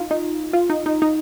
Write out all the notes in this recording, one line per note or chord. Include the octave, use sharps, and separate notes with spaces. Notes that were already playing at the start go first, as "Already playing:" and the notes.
Already playing: D#4 F4
D#4
F4
D#4
D#4
D#4